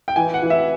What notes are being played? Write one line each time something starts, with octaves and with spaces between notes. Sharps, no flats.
G5
E3 G#5
F#5
E3
E5